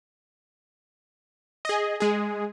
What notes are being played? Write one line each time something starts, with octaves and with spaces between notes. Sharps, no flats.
G#4 D#5
G#3 G#4